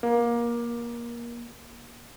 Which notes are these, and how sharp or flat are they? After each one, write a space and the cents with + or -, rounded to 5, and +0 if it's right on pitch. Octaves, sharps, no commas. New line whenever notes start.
A#3 +25